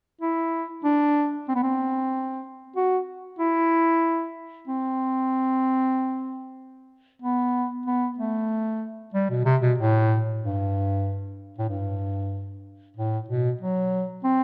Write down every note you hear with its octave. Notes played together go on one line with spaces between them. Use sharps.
E4
D4
C4
B3
C4
F#4
E4
C4
B3
B3
A3
G3
B2
C3
B2
A2
G2
A2
G2
A2
B2
F#3
C4